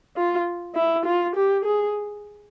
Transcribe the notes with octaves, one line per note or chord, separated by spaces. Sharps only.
F4
E4
F4
G4
G#4